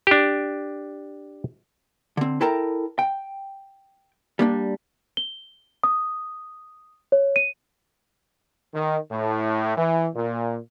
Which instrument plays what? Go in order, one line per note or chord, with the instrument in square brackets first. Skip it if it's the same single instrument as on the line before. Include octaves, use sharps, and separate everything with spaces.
[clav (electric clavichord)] D4 G4
[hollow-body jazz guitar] D3 C4
E4 A4 A#4 G5 A5 A#5
G5
G3 A#3 D4
[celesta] G7
D#6
C#5
D#7
[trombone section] D#3
A2
E3
A#2